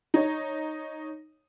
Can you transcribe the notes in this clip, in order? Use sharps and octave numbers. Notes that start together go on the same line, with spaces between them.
D#4 C#5